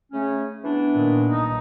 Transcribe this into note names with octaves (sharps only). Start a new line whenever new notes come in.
C#3 A3 C#4
E3 B3 D4
A#2 D#3
D#4